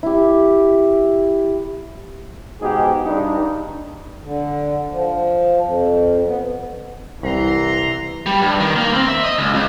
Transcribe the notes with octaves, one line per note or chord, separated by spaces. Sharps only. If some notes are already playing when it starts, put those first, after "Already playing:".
E4 G4
G#2 B2 G4 G#4
G2 D4 D#4
D3
F3
F2
B3
C2 E3 A#5 C6
G3
G2
D#3
A#3
C4
E5
D#5
C#2
C#2